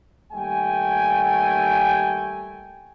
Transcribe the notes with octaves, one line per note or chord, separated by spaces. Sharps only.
D#2 G3 A3 G5 G#5